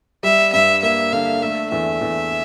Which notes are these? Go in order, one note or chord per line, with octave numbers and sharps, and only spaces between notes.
G3 E5
G2 E5
A#3 E5
D3 F5
A3 E5
E2 E5
E2